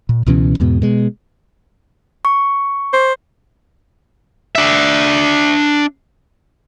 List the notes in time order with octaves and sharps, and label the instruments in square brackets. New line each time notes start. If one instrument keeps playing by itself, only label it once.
[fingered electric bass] A#2
C#2 B2 E3 C#4
E2 G#2 B2
B2 G#3
[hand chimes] C#6
[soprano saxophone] C5
[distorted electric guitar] D4 E5